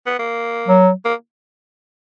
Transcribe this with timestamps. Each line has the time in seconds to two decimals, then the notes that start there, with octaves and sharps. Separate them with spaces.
0.06 B3
0.19 A#3
0.68 F#3
1.05 A#3